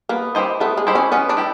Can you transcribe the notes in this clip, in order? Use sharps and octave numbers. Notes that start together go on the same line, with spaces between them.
A#3 B3
E4 G4 C5 D#5
A3 B3
G#3
E4 G4 C5 D#5
C#4
B3 C#4
D4
E4 G4